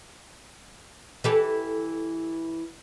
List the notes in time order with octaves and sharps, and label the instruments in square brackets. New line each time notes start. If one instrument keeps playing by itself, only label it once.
[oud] E3 G4 A4